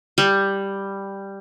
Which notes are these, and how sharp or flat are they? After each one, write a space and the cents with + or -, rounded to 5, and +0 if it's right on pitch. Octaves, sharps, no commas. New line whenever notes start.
G3 +5